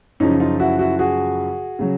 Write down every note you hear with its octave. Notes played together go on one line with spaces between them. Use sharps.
F#2 C#3 F3 C#4 D#4
D#4 F4
E4 F#4
E4 F#4
F#4 G#4
C#3 F#3